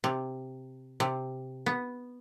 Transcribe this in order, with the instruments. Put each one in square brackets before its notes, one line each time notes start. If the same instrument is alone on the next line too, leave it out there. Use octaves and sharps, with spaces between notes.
[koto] C3
C3
B3